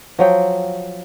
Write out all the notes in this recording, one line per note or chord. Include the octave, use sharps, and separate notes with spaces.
F3 F#3 G5